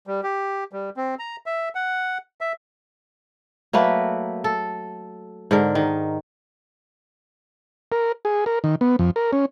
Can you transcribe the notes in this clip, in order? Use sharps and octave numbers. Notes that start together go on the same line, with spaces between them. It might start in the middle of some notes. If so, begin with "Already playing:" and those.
G3
G4
G3
C4
A#5
E5
F#5
E5
F#3 A3 A#3 B4
A4
G#2 D3 A#4
D#3
A#4
G#4
A#4
D#3
B3
F2
A#4
C#4